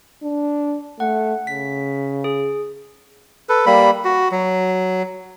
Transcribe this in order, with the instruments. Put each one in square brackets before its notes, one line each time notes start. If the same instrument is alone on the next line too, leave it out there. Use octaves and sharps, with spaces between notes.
[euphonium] D4
[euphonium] A3 [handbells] F#5
[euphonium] C#3 [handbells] B6
[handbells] G#4
[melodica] A4 B4
G3 A#3 B5
F#4
F#3